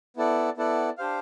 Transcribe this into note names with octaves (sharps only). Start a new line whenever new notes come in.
B3 E4 A4 D5 F#5
B3 E4 A4 D5 F#5
D4 G4 C5 F5